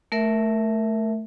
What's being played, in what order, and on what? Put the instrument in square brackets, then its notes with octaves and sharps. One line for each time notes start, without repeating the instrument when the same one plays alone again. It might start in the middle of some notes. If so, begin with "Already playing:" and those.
[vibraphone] A3 A#4 E5